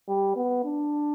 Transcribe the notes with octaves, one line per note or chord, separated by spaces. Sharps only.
G3
B3
D4